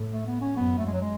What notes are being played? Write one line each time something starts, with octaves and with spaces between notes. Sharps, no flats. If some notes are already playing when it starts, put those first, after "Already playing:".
Already playing: A2
A3
B3
C#4
F#2 B3
A3
G#3
F#3
G#3